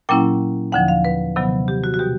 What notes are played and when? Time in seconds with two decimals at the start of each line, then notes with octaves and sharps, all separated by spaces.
0.09 A#2 F#3 A#3 C#4 E4 G5
0.72 D#2 D3 F3 F#5
0.88 F5
1.05 B4
1.36 C3 D#3 F#3 B3
1.68 G4
1.84 F#4
1.94 F#4
1.99 B2 G3 G4